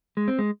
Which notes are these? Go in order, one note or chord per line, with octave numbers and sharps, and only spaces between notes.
G#3
C4
G#3